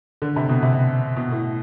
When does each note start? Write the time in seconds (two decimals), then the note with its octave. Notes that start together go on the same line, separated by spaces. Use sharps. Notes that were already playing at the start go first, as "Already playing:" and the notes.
0.22 D3
0.36 C3
0.49 B2
0.63 C3
1.16 B2
1.32 A2